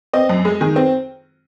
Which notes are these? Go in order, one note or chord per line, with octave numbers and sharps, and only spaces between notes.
C4 D#5
F#2
G#3
D#3 G#4
C4